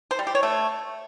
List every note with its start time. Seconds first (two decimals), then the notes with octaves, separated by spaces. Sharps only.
0.11 C5
0.19 G3
0.27 G4
0.35 C#5
0.43 A3